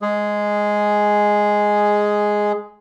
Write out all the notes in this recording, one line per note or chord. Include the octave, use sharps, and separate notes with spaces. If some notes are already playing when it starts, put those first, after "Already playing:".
G#3 G#4